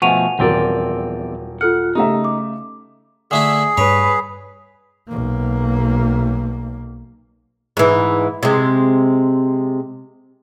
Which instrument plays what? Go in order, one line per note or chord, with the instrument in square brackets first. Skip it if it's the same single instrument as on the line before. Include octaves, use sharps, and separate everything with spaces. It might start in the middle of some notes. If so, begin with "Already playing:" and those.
[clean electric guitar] B2 F3 A3 [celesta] F#5 D#7 F7 [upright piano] G#5 C#6
[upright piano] D#1 F#3 A#4 [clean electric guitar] E2 C4 D5
[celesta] F4 A4 F6 [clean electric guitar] F#5
[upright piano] C#3 A3 E5 [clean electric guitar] D#4 [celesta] G4 A#5
[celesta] D6
[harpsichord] D3 A3 E4 [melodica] G#4
[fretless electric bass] G2 [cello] B4 [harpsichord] C#5
[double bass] B1 A#3
[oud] G#2 E3
C3 G#3